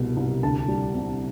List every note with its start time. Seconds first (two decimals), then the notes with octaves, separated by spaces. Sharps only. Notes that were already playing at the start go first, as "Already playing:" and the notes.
Already playing: C2 B2
0.17 C2
0.43 D2 A5
0.68 G3
0.94 C3